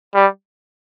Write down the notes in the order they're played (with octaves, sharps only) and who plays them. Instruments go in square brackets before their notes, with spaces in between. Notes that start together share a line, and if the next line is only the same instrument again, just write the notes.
[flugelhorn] G3